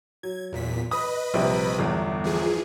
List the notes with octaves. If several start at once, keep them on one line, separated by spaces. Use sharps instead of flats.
F#3 G#6
E2 A#2 B6
B4 D#5 B5 D#6
A#1 C3 G3
G1 E2 A2
E3 F3 G#4